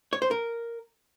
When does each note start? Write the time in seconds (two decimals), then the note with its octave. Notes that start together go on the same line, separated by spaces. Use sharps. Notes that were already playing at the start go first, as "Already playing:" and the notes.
0.13 C#5
0.22 C5
0.31 A#4